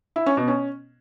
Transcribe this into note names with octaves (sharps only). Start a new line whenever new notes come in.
E4
C#4
B2
C#4